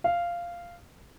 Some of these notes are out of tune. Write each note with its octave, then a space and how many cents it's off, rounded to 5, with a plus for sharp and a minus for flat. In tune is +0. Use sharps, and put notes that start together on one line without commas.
F5 -10